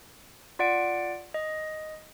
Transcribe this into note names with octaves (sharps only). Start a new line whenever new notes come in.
F4 D5 F#5 D7
D#5